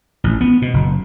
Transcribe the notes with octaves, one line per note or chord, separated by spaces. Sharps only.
A1
B3
B2
F#1